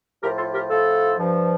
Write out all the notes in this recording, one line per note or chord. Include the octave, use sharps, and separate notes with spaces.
A2 F3 G4 A#4
F4 A4
G4 A#4
A2 F3 F4 A4
G2 F3